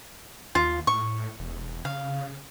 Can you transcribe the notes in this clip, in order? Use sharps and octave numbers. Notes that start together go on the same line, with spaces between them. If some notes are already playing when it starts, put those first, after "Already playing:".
D#2 F4
A2 C#6
E1
C#3 F5